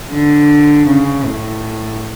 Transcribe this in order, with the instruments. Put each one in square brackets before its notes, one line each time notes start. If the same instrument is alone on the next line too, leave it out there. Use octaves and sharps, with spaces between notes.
[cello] D3
C#3
A2